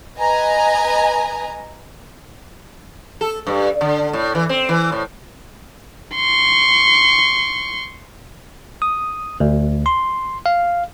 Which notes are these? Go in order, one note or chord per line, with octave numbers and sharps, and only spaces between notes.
B4 D#5 G#5 A#5
A4
G2
D3
A2
E3
C4
E3
A2
C6 C#6
D#6
D2
C6
F5